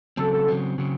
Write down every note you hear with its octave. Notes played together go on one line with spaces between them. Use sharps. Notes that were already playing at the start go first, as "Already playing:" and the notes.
C#3 F#3 C4 A4
A4
C#3 F#3 C4
C#3 F#3 C4